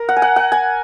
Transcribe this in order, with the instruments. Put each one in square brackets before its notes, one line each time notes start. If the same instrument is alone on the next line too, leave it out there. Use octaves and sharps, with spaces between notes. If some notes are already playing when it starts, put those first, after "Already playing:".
Already playing: [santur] A#4
F#5
G#5
F#5
F#5
G#5